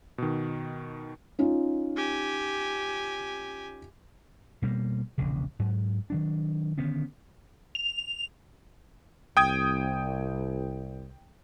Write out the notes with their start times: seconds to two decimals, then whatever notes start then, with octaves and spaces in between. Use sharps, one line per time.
0.18 B2 D#3
1.39 C#4 D#4 F4
1.96 G4 G#5
4.62 B2 G3 A3 A#3
5.18 E1 A#1 C#3
5.59 G#2 F#3
6.10 D#3 F#3 D4
6.78 D3 D#3 B3 C#4
7.75 F7
9.37 C2 G5 D#6 G#6